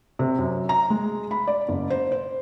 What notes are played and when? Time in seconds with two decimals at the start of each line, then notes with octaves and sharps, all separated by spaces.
0.19 C3
0.38 F#2
0.69 A#5
0.90 G#3
1.31 B5
1.47 D5
1.68 F#1
1.90 C5
2.12 C5